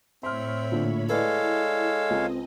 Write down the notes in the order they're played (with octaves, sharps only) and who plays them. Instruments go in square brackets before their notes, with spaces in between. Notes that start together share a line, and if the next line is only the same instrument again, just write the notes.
[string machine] A2 C#5 B5 [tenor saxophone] C4 [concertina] E5 [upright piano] C6 F6
[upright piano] A#2 D3
[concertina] G#3 C#5 F5 [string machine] E4 [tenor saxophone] A4 [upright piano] B4 D5
[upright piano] C#2 [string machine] C4 D#5